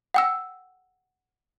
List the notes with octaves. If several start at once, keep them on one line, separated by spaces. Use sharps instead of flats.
F#5 G5 E6